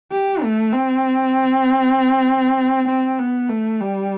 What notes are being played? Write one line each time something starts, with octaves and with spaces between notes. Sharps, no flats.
G4
A3
C4
C4
B3
A3
G3